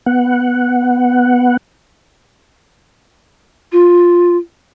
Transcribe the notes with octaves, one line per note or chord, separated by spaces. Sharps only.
B3 F#5
F4